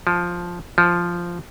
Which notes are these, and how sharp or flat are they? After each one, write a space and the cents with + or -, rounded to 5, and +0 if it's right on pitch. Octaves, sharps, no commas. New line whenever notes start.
F3 +5
F3 -5